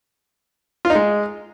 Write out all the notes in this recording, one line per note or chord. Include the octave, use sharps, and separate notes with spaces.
F4
D#4
G#3